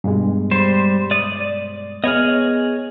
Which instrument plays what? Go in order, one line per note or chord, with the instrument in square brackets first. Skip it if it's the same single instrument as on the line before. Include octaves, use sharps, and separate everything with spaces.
[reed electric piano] G2 B2 G#3
[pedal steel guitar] G3 C5
D5 D#6
[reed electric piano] B3 F6 [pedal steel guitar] G#4 C#5 D#5